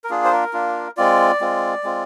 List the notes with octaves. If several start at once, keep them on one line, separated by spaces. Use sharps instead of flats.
A#4
A#3 D4 F4 G#4
C5
A#4
A#3 D4 F4
G#3 C4 F4 D5
G#3 C4 F4
G#3 C4 F4